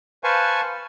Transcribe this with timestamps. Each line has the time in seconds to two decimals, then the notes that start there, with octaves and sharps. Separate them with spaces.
0.24 B4 C5 F5 G#5 A5 C#6